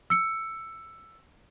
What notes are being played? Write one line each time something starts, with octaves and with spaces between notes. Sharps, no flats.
E6 C#7